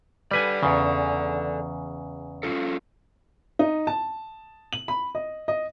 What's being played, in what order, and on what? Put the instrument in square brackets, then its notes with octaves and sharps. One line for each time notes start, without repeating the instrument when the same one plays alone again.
[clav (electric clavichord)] G3 B4 G#5 [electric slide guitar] A4 D5
[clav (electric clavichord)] E2 C#3
[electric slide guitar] C#4 F4 A4
[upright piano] D#4
A5
F#7
B5
D#5
D#5